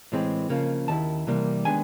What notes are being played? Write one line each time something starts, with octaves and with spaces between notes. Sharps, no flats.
A2 E3 G#3 C4
C#3 F3 A#3
D#2 D#3 E4 A5
C3 E3 G3 A#3
D#3 G#3 B3 D4 G#5